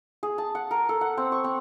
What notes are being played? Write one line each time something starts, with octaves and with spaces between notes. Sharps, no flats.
G#4
A5
F#5
A#4
A4
F#5
C4
C#6
C4